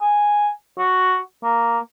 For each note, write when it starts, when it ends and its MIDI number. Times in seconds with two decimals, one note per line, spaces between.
0.01 0.49 80
0.78 1.19 66
1.44 1.78 58